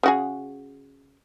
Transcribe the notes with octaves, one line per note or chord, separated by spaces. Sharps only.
C#3 F#4 G#4